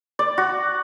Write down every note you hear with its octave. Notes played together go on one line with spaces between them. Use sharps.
D5
F#4